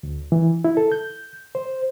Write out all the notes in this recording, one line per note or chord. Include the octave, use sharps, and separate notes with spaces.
D2
E3
E4
A4
G6
C5